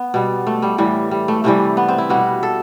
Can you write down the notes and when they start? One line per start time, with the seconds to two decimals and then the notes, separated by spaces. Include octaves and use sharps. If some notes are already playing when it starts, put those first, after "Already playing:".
Already playing: B3
0.14 B2 G3
0.47 A3
0.62 G3
0.78 A2 E3 G3
1.11 G3
1.28 A3
1.44 C3 E3 G3 A3
1.77 B3
1.88 C4
1.98 E4
2.10 B2 G3 F#4
2.43 A4